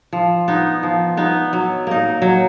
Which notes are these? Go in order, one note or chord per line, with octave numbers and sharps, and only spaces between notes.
F3
B3 D#4
F3
B3 D#4
F#3
A#3 D#4
F#3